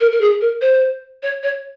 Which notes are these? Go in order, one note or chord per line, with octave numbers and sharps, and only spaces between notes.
A#4
A#4
G#4
A#4
C5
C#5
C#5